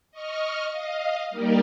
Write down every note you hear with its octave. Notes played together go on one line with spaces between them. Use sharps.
D#5 C#6 F6
D#5 F5
G3 A#3 D#4 G4 A#4 D5